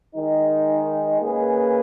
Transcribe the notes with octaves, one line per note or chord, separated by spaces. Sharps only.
D#3 G#3 D#4
A#3 C#4 G#4 B4